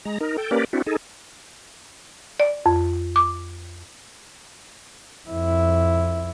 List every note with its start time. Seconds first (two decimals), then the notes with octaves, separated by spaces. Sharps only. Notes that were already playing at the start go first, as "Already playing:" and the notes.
0.05 G#3 A#5
0.21 D#4 A#4
0.38 A4 G5
0.51 A#3 C#4 G4 A#4 B4 D5
0.73 C4 D4 E4 F#4
0.86 D#4 G#4 A4
2.40 D5
2.66 F2
3.16 D6
5.29 F2 E4